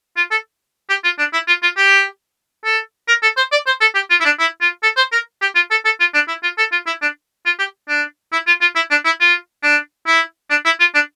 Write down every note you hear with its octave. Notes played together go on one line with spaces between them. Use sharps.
F4
A4
G4
F4
D4
E4
F4
F4
G4
A4
A#4
A4
C5
D5
C5
A4
G4
F4
E4
D4
E4
F4
A4
C5
A#4
G4
F4
A4
A4
F4
D4
E4
F4
A4
F4
E4
D4
F4
G4
D4
E4
F4
F4
E4
D4
E4
F4
D4
E4
D4
E4
F4
D4